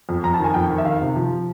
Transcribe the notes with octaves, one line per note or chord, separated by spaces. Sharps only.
F2
F2 A#5
A5
D#3 G#5
F2 G5
D#3
E5
D#3 F5
C3
F3